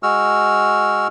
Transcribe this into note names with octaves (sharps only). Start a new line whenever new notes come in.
G#3 F#4 E6 F6